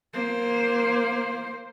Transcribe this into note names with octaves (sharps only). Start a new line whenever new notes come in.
A#3 C5